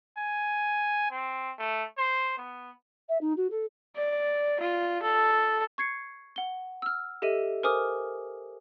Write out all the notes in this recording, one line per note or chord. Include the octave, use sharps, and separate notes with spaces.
G#5
C4
A3
C5
B3
E5
D#4
F#4
A4
D5
F4
A4
C#6 G#6 C7 C#7
F#5 G7
E6 F6
G4 A4 D#5 E5 D#7
A#4 C5 G#5 D6 D#6 F6